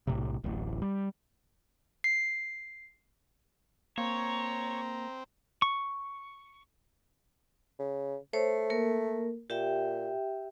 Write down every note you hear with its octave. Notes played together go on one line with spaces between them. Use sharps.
B1 A2 C3
D1 A1
G3
C7
A#3 C4 C#5 A#5
C#6
C#3
A3 C5 C#5
A#3 A#4
A#2 G4 E5 G5